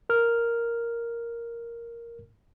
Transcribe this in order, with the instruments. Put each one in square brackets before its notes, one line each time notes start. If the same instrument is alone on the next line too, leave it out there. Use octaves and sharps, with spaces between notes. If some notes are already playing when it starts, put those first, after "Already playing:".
[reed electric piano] A#4 F6